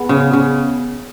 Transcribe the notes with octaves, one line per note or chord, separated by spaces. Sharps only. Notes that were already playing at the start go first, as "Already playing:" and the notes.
Already playing: B3 G#4
C#3
C#3